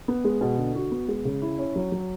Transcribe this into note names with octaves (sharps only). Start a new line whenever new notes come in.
B3
G#3
B2
D3
F#4
B3
G#3
C#3
E4
C#4
F#3
F#3